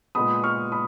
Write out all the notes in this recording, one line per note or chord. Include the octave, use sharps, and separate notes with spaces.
A#2 G#3 B3 B5 D#6
C#6 F6
B5 D#6